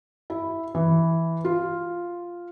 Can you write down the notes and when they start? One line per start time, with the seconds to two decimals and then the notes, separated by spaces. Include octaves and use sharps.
0.30 E4
0.75 E3
1.45 F4